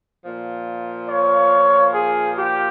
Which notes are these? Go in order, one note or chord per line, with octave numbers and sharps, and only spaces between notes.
A#2 F3
C#5
G#4
G4